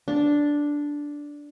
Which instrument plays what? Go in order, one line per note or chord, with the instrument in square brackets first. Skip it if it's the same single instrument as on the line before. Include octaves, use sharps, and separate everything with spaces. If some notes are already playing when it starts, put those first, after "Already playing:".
[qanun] D4